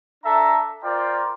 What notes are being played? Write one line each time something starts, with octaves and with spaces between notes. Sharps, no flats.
D4 A4 E5 A#5
F4 A#4 C5 D5 G5